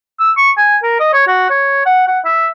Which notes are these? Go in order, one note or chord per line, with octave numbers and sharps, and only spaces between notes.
E6
C#6
G#5
A#4
D#5
C#5
F#4
C#5
F#5
F#5
E5